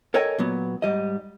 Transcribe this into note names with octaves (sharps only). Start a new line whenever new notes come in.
A4 A#4 C#5 D#5 G5 G#5
A#2 F#3 B3
G#2 G3 D#5